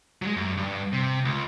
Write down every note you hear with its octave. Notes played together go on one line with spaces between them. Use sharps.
F#3 G#3
F#2
G2
C3
C#2